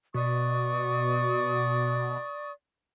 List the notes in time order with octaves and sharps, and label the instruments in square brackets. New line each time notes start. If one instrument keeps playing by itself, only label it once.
[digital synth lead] B2 [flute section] D5 C#6 D#6